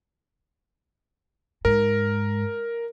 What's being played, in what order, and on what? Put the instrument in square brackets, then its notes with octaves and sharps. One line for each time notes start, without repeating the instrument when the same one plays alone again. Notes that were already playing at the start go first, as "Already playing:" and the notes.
[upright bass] G#2 [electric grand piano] A#4